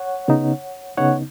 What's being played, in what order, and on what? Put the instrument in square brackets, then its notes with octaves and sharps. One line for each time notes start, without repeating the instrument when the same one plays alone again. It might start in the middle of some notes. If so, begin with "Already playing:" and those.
Already playing: [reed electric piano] C#5 F#5
C#3 B3 D#4
C#3 B3 D#4 C#5 F#5